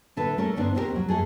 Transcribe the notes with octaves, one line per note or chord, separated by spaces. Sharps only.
A2 D3 A4 B4
A3 C#4 A4 A#4
G2 D3 B3 C4 D4 D#4
D#2 B2 C4 F#4 G4 A#4
F#3
F#2 A3 G#4 A4